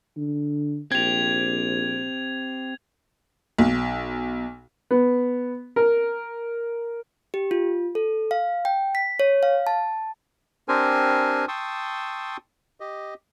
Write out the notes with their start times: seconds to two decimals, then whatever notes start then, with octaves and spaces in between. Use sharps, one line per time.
0.17 D3
0.92 A#1 C4 G4 G#6 F7
3.58 B1
4.91 B3
5.76 A#4
7.34 G4
7.51 F4
7.95 A4
8.31 F5
8.65 G5
8.95 B6
9.20 C#5
9.43 F5
9.67 A5
10.68 C4 D4 G4 A#4 C5 G#5
11.48 G5 A5 C6 C#6 D#6 E6
12.80 G4 D#5